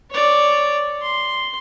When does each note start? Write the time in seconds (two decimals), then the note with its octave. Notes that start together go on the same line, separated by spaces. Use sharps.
0.11 C#5 D5
1.02 C6